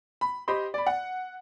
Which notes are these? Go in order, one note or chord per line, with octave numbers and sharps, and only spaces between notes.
B5
G4 C5 D#5 B5 C6
D5 B5
F#5